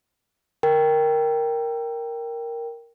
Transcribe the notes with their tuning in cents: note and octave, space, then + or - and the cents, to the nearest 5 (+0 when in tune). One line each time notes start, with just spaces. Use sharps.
A#4 +0 G5 +0